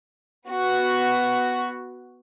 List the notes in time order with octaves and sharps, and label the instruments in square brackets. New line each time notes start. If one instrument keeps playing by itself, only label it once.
[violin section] B3 F#4